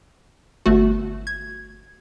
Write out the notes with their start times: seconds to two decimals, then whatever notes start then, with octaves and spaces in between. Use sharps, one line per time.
0.66 G1 A3 F#4
1.27 G#6